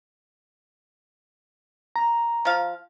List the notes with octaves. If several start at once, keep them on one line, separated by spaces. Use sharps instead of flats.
A#5
F3 F5